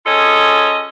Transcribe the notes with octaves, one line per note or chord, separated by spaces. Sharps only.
C#4 F4 G#4 A4 C#5 D#5